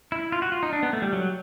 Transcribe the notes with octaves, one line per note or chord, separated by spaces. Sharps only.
E4
F4
F#4
F4
D#4
D4
B3
A3
G3
F#3